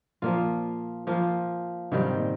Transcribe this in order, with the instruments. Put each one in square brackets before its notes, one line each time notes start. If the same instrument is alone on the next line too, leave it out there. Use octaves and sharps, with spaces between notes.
[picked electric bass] A#2 [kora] F3 A#3 F4
[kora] F3 A#3 F4
[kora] G#2 D#3 G3 C4 [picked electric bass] C3
[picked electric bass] A#2